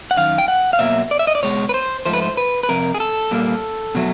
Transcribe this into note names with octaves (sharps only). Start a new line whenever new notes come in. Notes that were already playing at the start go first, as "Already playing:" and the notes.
F#5
F#2 D#3 F5
G5
F#5
F5
B2 F#3 A#3 E5
D5
E5
D#5
D5
B2 G#3 C#5
B4
C5
G#2 F3 A3 C5
B4
C5
B4
B4
F2 C3 A#4
G#4
A4
A#2 G3 A#3
B2 F#3 A3